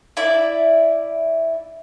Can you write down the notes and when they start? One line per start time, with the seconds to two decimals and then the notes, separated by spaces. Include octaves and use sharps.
0.17 E4 D5